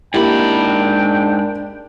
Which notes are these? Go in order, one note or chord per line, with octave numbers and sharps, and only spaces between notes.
G#2 A#3 D4 E4 G4 G5 B5